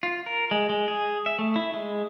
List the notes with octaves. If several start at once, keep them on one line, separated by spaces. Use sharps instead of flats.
F4
A#4
G#3
G#3
G#4
E5
A3
E4
G#3